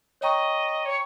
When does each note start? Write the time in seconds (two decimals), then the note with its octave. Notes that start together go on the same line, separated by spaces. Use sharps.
0.21 C#5 D#5 G5 A#5 C#6
0.85 C#5